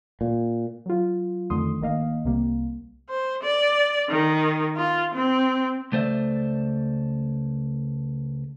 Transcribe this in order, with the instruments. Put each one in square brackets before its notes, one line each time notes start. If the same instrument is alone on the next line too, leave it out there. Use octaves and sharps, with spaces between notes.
[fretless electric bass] A#2
[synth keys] F#3 F4
F2 D3 D#3 A3 C6 D#6
G#1 D#3 A#3 D#5 F5
C2 C3 G3 A#3
[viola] C5
D5
D#3
F4
C4
[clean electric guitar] C#2 A3 C5 D5 E5